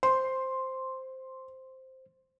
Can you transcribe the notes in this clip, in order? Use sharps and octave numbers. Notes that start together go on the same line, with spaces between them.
C5 C6